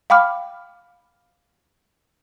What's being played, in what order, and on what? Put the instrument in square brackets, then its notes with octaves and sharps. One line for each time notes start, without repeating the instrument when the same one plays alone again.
[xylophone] F5 G5 B5 D6 F6